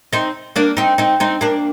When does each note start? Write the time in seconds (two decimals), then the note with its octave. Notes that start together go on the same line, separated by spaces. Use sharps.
0.13 C4 D#4
0.56 A#3 D4
0.77 C4 D#4
0.98 C4 D#4
1.20 C4 D#4
1.41 A#3 D4